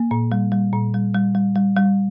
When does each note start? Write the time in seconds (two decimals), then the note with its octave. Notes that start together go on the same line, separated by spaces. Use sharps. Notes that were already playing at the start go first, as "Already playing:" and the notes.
Already playing: A#3
0.11 A#2
0.32 G3
0.52 G3
0.73 A#2
0.94 G3
1.14 G3
1.35 G3
1.56 G3
1.76 G3